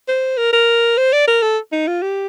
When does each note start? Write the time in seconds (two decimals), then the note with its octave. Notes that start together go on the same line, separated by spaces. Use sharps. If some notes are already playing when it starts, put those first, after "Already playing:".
0.08 C5
0.37 A#4
0.53 A#4
0.97 C5
1.13 D5
1.28 A#4
1.42 A4
1.72 D#4
1.87 F4
2.02 G4